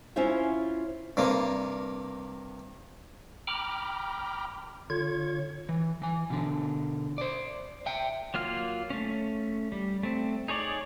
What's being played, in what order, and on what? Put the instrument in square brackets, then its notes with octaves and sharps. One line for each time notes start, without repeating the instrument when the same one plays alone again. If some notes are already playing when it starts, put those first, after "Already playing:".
[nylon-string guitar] C#4 E4 F4 C5 C#5 E5
[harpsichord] G2 C3 A#3
[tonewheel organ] G5 A#5 B5 D6 F6
D3 F4 C#5 G#6
[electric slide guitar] E3
E3 G#5
B2 D3
C5 D5
E5 G5
[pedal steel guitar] F#3 A#3 F4 F6
A3 C#4
G3
A3 C4
D#4 G#4 C#5 D5